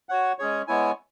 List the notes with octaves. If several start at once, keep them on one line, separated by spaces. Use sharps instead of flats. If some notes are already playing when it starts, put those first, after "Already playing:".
F#4 C#5 F#5
G#3 C#4 G#4 C#5
G#3 B3 E4 C#5 G#5